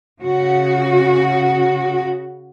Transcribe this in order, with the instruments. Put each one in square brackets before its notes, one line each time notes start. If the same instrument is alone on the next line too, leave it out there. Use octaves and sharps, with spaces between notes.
[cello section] C#3 F#4